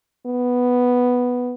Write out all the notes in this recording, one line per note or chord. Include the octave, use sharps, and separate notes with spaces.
B3